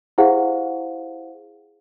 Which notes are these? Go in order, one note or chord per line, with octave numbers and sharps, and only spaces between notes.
E4 G4 G#4 C5 F5 F#5